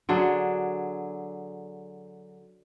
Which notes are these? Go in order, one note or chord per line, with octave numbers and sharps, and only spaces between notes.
D3 F#3 D4 G#4